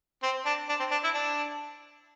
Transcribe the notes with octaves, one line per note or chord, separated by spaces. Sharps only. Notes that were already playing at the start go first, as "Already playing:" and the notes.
C4
D4
D4
C4
D4
E4
D4